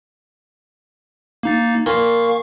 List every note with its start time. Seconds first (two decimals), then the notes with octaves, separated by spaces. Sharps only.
1.43 A#3 D#4 A6
1.86 A#2 F5 C#6